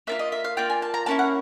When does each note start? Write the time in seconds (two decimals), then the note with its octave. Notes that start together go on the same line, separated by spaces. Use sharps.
0.07 A#3 D4 F4 E5
0.19 D#5
0.32 E5
0.44 F5
0.57 A#3 D4 F4 G5
0.70 G#5
0.82 A5
0.94 A#5
1.06 A#3 C#4 E4 A5
1.19 F#5